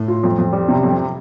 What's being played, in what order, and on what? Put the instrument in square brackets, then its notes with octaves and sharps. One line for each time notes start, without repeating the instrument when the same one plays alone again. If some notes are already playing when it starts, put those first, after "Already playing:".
Already playing: [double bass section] A2
[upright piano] F4
F2
F2
G3
C3
F2